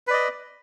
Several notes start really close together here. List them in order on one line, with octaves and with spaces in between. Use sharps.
B4 D5 D#5